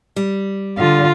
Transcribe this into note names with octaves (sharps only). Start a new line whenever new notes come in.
G3
D3 F4